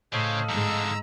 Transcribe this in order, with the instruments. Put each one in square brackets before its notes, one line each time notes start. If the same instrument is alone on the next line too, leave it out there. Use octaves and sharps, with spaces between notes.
[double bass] A2 [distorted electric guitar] C#3 [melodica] A4 D#5 F5 [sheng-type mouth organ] C5 C#5
[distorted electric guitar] F2 D3 [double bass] G#2 G#3 [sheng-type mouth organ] A#5 E6